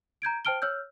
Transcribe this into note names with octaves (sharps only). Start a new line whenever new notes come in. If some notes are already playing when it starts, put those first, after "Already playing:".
A#5 G6 G#6 D7
C5 G5 A5 F6 D7 G7
C#5 E6 F6 G6